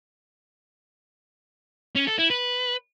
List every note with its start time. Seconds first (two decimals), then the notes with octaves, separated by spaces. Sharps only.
1.95 C#4
2.07 A4
2.19 E4
2.30 B4